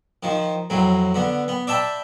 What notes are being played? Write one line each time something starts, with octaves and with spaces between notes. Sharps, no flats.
D#3 F3
F2 A2 F#3
D3 B3
B3
D5 E5 G5 A5 B5